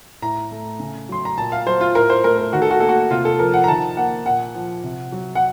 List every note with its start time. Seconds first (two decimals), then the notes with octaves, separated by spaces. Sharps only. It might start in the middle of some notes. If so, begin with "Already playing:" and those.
0.22 A2 A#5
0.51 A3
0.80 C#3
1.09 F#3 C6
1.25 A#5
1.37 A#2 A5
1.52 F5
1.66 F#3 C5
1.81 F4
1.95 A2 A#4
2.10 C5
2.24 A3 A#4
2.38 A#4
2.53 D#3 F#4
2.62 A4
2.71 F#4
2.80 A#3 A4
2.89 F#4
3.10 C3 F4
3.25 A4
3.39 F3 A#4
3.54 F#5
3.64 A#5
3.68 D#3 A5
3.97 A#3 F#5
4.26 A#2 F#5
4.55 F3
4.84 C3
5.12 F#3
5.35 F#5